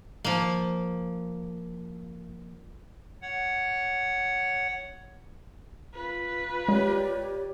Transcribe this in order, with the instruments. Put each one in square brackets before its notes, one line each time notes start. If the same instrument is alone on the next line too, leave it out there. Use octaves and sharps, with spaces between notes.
[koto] F3 A#3
[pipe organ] C#5 F#5
[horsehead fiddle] F4 B4
[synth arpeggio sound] G#3 [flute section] G4 C#5 D5